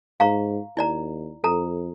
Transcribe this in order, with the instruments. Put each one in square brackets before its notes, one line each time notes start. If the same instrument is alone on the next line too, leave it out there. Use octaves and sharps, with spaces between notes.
[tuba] G#2 [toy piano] F5 A#5 C#6
[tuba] D#2 [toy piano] E4 D5 A#5
[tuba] F2 [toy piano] A4 A#5